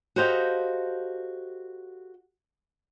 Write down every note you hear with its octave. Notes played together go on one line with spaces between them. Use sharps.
F#4 G4 A4 C5 D#5 F5